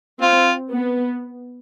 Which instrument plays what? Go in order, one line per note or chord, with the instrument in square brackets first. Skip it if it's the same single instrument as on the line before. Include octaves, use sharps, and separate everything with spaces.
[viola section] C4 [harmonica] F4
[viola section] B3